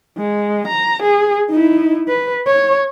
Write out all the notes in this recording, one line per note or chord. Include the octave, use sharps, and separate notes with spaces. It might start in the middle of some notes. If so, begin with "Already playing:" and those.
G#3
A#5
G#4
D#4 E4
B4
C#5